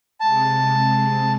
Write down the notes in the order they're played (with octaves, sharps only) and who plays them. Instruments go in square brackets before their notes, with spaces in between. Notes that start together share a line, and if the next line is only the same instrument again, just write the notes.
[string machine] C3 G#3 [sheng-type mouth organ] A5